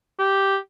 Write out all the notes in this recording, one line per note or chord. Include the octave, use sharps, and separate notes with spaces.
G4